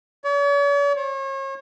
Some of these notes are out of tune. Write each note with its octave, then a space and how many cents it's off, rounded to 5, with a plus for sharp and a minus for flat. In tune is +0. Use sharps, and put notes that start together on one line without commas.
C#5 +45
C#5 -40